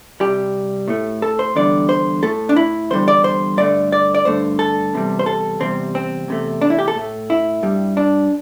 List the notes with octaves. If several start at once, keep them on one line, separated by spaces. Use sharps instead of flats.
C3 G3 G4
A2 A3
A4
C5
E2 D3 G3 D5
C5
A2 A3 A4
D4
E4
E2 D3 G3 C5
D5
C5
G2 D3 A3 D5
D5
D5
G2 D3 A3 C5
A4
E2 C3 G3
C5
A4
E2 C3 G3 C4
C4
E2 C3 A3
D4
E4
G4
A4
A2 A3
E4
G2 G3
D4